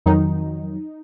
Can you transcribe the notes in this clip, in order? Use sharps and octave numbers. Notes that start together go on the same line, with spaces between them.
F2 D#3 F#3 D#4